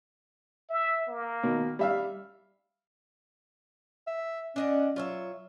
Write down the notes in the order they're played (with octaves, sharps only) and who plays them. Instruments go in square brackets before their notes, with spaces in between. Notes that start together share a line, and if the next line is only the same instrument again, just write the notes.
[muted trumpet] E5
A#3
[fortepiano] B2 D#3
G3 E5 F5
[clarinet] E5
[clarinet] C#4 [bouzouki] D4 D#5 F#5
[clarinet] F#3 [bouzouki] F4 C#5 E5